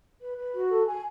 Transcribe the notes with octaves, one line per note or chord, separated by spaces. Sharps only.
B4
B4
F#4
A4
G#5